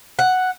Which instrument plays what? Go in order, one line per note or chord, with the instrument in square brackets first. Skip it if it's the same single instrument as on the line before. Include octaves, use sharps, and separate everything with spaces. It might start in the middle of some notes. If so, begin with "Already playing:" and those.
[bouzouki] F#5